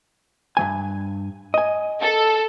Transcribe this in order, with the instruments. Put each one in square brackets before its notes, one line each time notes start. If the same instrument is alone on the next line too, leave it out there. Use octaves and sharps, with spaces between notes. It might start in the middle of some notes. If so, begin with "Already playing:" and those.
[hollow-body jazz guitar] G2 F#3 G#5
D#5 G#5
[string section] A4